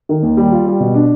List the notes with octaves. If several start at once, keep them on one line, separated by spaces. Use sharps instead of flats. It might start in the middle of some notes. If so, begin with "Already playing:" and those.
D#3
D#2
G3
F4
G3
B2
D4